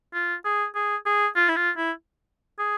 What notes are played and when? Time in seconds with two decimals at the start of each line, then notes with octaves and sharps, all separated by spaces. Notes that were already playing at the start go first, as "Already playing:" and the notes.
0.13 F4
0.45 G#4
0.75 G#4
1.06 G#4
1.36 F4
1.49 E4
1.56 F4
1.77 E4
2.59 G#4